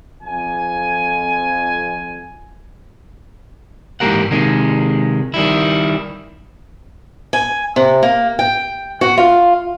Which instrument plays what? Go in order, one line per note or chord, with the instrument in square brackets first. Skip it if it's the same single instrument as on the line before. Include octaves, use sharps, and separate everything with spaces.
[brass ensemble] F2 G#5
[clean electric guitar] G#2 E3 A#3 G4 A#4 F#5
C3 D#3 G#3
D#3 G3 E4
[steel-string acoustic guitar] G#5
C3
A#3
G5
F#4
F4